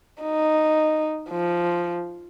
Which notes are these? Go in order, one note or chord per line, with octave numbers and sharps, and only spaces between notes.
D#4
F3